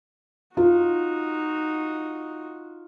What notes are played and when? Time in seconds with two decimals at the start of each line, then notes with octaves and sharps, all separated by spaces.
0.57 D#4 F4 F#4